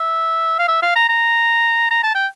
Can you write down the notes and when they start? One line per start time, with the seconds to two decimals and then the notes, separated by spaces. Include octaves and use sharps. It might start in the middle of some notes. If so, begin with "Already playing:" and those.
Already playing: E5
0.59 F5
0.68 E5
0.82 F5
0.96 A#5
1.09 A#5
1.91 A#5
2.03 A5
2.15 G5